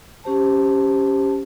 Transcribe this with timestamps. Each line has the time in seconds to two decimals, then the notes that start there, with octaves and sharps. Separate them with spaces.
0.24 C#4 G4 C5 A5